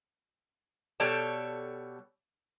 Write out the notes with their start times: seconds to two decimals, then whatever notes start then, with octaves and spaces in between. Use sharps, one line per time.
1.00 B2 G3 A4 C#5 D5 A5